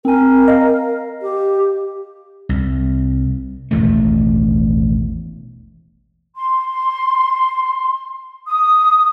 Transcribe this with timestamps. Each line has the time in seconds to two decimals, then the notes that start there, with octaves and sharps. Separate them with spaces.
0.05 C4 A#4 G#5
0.48 D#5 F5
1.22 G4
2.49 C2
3.71 E1 A1 D#2 A3
6.35 C6
8.46 D#6